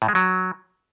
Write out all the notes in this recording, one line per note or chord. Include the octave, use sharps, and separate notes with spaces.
A2
G#3
F#3